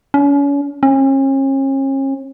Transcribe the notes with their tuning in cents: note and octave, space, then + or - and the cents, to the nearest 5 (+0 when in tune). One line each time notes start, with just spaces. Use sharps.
C#4 +35
C#4 -40